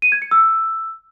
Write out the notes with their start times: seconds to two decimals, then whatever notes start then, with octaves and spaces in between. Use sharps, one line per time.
0.02 D#7
0.12 G#6
0.22 C#7
0.31 E6